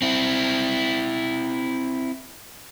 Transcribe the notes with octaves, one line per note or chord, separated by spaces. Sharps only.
C4 E4